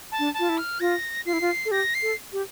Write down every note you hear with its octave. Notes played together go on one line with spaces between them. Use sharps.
A5
D4
A5
F4
E4
F6
F4 A#6
F4 C7
E4
F4
A4
G4 A#6
C7
A4
G4